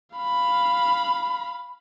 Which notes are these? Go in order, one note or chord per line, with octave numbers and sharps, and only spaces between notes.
F5 B5